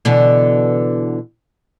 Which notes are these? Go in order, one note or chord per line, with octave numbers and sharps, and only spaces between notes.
B2 D3 E3